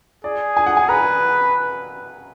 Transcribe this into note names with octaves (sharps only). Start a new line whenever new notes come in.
G#4 D5
G#5
F#5
G#5
B4 A#5